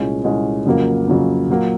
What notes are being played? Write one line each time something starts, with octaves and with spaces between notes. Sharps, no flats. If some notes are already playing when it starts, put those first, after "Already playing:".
Already playing: C2 A#2 G#3 C#4
C2 A#2 G#3 C#4
F2 C#3 F#3 A#3
F2 C#3 F#3 A#3
A#2 F#3 A#3